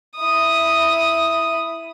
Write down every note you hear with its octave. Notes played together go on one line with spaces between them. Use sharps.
E4 D#6